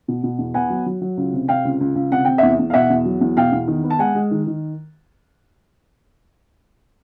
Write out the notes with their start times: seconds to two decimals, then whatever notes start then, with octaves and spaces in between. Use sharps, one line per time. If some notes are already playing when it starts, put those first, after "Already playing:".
0.08 B2
0.24 B2
0.39 E2
0.54 B3 F#5 G#5
0.70 F#3
0.86 F#3
1.01 F#3
1.17 C#2
1.33 C3
1.48 C3 F5 G5
1.65 C#2
1.80 C#2
1.95 C#2
2.11 C3 F#5
2.25 C3 G5
2.38 E2 E5 F#5
2.59 E2
2.70 F5
2.74 B2 E5 F#5
2.90 E2
3.05 F#3
3.21 E2
3.37 B2 F5 G5
3.52 E2
3.68 D#3
3.84 B3
3.90 A5
3.99 G#3 F#5 G#5
4.15 G#3
4.31 D#3
4.47 D#3